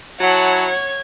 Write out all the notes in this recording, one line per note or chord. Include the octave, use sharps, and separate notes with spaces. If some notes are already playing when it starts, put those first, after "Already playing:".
F#3 E4 C#5 F#5 A5
G#6